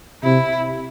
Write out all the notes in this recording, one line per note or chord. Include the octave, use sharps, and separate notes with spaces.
C3 E4